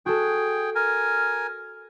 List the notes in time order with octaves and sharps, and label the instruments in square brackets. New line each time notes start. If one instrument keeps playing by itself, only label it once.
[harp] F#4 A4 [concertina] G#4 G5
[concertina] A#4 G#5